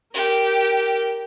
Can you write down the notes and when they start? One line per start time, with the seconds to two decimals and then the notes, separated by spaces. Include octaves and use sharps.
0.14 G4 A#4